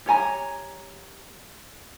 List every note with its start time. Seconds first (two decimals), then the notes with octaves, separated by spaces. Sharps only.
0.06 G4 C#5 G#5 A#5